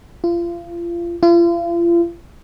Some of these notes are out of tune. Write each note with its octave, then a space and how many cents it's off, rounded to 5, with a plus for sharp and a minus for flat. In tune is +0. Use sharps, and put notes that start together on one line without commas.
F4 -30
F4 -40